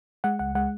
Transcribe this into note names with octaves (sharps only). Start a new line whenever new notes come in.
G#3 F#5
C#2 F#5
G#3 F#5